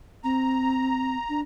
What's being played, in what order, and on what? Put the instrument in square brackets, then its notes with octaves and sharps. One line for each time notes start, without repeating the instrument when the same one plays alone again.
[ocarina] C4 [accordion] A#5
[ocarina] D4